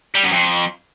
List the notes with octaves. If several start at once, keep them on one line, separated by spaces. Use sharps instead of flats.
G3
F#2
F2